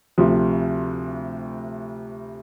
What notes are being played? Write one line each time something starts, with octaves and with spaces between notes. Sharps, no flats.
D2 C3 F3